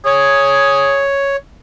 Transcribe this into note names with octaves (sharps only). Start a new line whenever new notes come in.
G#4 C#5